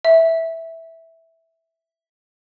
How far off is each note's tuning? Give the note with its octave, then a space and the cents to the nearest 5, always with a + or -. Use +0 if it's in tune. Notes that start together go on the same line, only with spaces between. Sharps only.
E5 -5